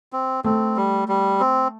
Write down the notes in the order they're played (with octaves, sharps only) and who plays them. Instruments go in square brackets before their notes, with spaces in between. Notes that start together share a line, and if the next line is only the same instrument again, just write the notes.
[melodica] C4
[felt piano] A3 [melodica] C4
[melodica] G3
G3
C4